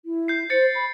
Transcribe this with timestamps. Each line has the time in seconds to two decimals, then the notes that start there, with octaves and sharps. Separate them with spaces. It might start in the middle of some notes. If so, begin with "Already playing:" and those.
0.05 E4
0.28 G6 C7
0.50 C5 A6 C#7
0.75 B5